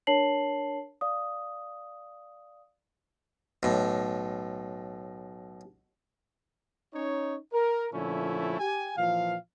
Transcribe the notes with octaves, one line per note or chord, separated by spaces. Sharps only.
D4 A#4 C#5 A5 C7 F#7
D5 F5 D#6
B1 A2
C#4 D#4 C#5
A#4
A#2 D3 F3 A3 C#4 E4
G4 G#5
A#2 E3 F3 F5